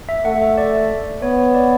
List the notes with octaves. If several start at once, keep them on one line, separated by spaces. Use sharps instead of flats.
E5
A3 F#5
E5
D5
B3 C#5
C#5
D5